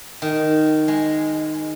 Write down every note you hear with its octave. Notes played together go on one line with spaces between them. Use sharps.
D#3
G#3